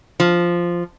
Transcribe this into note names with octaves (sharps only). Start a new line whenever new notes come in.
F3